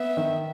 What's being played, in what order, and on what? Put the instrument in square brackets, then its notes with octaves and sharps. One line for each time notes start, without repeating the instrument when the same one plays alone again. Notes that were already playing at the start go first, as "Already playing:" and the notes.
Already playing: [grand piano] B3 [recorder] E5
[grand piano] D#3